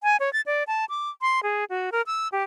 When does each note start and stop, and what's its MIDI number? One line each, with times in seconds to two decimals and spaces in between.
0.03 0.17 80
0.20 0.32 73
0.33 0.41 93
0.46 0.64 74
0.67 0.85 81
0.89 1.10 86
1.21 1.40 84
1.43 1.64 68
1.70 1.90 66
1.92 2.02 70
2.07 2.28 88
2.32 2.44 67